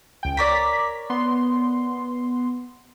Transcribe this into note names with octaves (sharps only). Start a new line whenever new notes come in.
C#2 G5
A#4 C#5 D5 B6
B3 C6